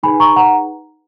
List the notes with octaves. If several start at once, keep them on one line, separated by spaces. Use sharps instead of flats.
D#4 G#4 B4 G#5 B5
A#5 C#6
F#5 A#5